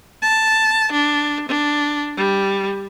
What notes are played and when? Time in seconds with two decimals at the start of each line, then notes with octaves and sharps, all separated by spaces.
0.22 A5
0.92 D4
1.48 D4
2.17 G3